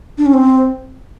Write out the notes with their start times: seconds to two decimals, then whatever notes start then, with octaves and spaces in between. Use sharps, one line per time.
0.18 D4
0.26 C#4
0.33 C4